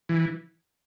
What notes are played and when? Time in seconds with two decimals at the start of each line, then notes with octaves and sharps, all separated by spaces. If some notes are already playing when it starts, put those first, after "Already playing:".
0.09 E3